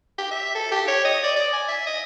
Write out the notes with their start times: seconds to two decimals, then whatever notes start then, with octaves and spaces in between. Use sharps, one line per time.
0.18 G4
0.31 E5
0.55 A4
0.71 G4
0.88 C#5
1.05 D#5
1.24 D5
1.36 D5
1.53 G#5
1.69 E5
1.86 D#5